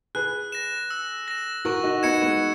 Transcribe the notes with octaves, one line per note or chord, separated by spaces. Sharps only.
G#4 B4 F#6
A#6 E7
E6
A#6 E7
F#4 A#4 C#6
D#4 F#4
B3 D#4 G#6 C#7 E7
G#3 B3